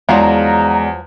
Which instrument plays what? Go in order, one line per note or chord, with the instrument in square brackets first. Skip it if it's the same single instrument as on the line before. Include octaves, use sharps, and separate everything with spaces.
[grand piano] E2 [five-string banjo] F3 F#3 F4 [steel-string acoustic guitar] G#3 D4 [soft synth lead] A#5